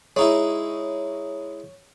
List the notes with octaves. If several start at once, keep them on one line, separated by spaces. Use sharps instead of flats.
G#3 D#4 E4 C#5